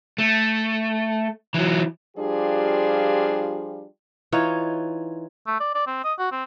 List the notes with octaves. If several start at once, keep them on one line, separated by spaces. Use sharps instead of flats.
A3
E3 F#3
F3 G3 D4 F4 G4 G#4
E3 D#4 F4 C#5
A3
D5
D5
C4
D#5
F#4
C4